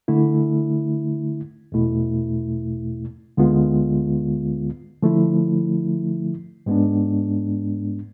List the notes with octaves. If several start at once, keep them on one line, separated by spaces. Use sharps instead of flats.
D3 A3 E4
E2 B2 A3 E4
D2 D3 G#3 B3 F4
D3 F3 A3 E4
G#2 G#3 B3 D4